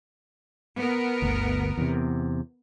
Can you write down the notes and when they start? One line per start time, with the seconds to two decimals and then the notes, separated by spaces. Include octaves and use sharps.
0.76 B3 A#4
1.22 G1 D2
1.77 E2 C3